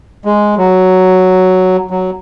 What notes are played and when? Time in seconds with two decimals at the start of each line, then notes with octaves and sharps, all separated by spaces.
0.25 G#3
0.58 F#3
1.91 F#3